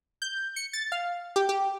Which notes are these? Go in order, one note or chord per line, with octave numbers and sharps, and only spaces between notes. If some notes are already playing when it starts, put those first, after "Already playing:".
G6
C#7
A6
F5
G4
G4